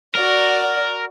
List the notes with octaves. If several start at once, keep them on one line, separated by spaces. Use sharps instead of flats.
F#4 A#4 D5